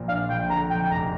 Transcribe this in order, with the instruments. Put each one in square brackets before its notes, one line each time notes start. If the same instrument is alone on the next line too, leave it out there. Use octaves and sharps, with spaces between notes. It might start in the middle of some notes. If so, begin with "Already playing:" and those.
Already playing: [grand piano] A#1 A#2 F3
[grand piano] D4 [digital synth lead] F5
[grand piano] A#1 [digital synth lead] G5
[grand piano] D3 [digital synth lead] A#5
[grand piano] F2 [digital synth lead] G5
[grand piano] F1 [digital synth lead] A#5